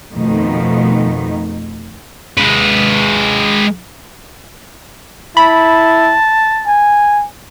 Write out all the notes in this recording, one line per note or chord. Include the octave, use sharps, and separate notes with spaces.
F2 B2 D#3 F3 A3 D#4
G#3 B4
E4 A5 B5
G#5